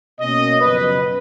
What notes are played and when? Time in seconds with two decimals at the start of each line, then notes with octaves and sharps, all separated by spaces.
0.18 B2 A#3 C#4 D#5
0.59 F#2 C#3 F3 B3 B4